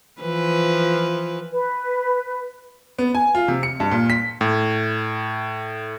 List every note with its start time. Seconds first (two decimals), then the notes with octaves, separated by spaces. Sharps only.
0.22 E3 F3 B4
1.52 B4
2.99 B3
3.15 G#5
3.35 F4
3.48 C3
3.63 C#7
3.80 G2
3.91 A#2
4.10 B6
4.41 A2